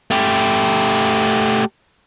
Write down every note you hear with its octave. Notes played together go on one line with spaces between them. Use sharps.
A3 G4